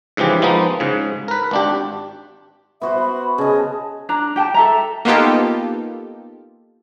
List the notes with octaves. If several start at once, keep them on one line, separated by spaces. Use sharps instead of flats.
G#2 C#3 E3 F3 G4
F3 G#3 A#3 B3 D#4
G#2 C#3
A#4 B4
G#1 D4 G4
B3 F#4 C5 E5
B5
C#3 D#5 A5
D4 A#5
G4 G5 A5
A4 E5 A#5
A#3 B3 D#4 F4 G4 A4